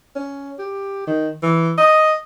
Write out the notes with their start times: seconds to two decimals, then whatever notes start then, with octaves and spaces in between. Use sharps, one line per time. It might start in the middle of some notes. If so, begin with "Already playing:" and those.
0.15 C#4
0.59 G4
1.07 D#3
1.42 E3
1.78 D#5